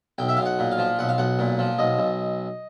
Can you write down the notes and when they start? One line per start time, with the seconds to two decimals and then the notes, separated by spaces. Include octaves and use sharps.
0.18 B1 G5
0.28 E5
0.37 B1 F5
0.45 F#5
0.59 A#2
0.72 F5
0.78 F3
0.99 B1 F#5
1.09 F5
1.18 B1 F#5
1.39 A#2
1.59 F3
1.79 B1 D#5
1.99 B1